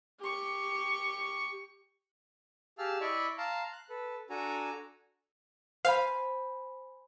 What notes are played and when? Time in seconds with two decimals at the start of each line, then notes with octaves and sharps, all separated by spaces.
0.20 G4 C#6
2.78 G4 G#4 F5 A5 E6 F6
3.01 E4 D5 D#5 B5 C#6
3.38 F5 A5 A#5 C6
3.73 F#6
3.90 A4 B4
4.30 D4 F#4 A4 G#5 A#5
5.85 C5 F5 G#5 B5